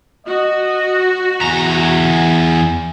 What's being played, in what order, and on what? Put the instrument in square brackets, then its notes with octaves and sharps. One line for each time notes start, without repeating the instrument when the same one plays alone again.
[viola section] F#4 [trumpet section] D#5
[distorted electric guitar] E2 A#5 [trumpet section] G#5